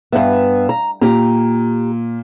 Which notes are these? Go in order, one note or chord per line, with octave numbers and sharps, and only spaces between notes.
G2 B3 E5 F5
A#5
A#2 G4 A#5